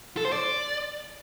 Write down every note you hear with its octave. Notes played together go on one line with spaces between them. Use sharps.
A4
C5
D5